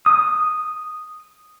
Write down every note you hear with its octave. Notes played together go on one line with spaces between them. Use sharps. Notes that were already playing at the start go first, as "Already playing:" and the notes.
D#6